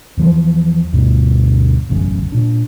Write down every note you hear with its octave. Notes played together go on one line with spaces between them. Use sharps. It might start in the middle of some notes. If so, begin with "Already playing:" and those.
E2 E3 F3
D2 G2 B2
E1 A1 F#2 C#3
A#2 D4